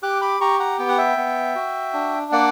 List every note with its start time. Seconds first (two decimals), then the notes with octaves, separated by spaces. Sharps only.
0.03 G4 D6 F#6
0.22 B5 D6
0.41 G4 A#5 C#6
0.60 F#5 A#5
0.79 B3 G5
0.88 F#5
0.98 E5 G5
1.17 B3
1.55 F#4
1.94 D4
2.32 A#3 D5 F#5